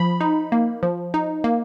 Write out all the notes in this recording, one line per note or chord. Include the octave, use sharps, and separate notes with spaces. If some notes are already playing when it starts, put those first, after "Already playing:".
Already playing: F3 B5
D#4
A#3
F3
D#4
A#3